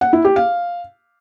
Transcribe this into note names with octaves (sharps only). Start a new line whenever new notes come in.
F#5
E4
G4
F5